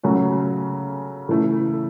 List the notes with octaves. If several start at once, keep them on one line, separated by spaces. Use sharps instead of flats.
C#3 F#3 A3 C#4 F#4
C#3 E3 A3 E4